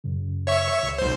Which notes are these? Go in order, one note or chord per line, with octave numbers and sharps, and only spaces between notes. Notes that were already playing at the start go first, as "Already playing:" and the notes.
F#2 C#3
C#5 E5 C#6
C#2
B1 C5